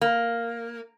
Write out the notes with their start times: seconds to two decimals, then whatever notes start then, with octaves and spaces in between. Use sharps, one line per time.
0.01 A#3